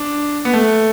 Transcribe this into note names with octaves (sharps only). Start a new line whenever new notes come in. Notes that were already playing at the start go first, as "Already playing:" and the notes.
Already playing: D4
B3
A3